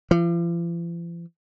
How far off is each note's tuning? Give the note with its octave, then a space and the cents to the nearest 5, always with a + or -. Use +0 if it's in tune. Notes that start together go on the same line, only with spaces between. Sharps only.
F3 -45